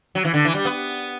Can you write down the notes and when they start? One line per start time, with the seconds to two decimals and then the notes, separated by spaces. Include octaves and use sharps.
0.15 F#3
0.25 E3
0.34 D3
0.45 E3
0.55 G3
0.65 B3